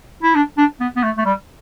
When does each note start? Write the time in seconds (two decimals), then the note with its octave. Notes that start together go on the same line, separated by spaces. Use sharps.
0.23 E4
0.35 D4
0.58 D4
0.80 B3
0.96 B3
1.03 A3
1.17 A3
1.26 G3